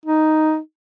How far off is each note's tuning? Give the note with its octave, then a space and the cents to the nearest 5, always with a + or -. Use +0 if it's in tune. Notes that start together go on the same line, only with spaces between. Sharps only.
D#4 +0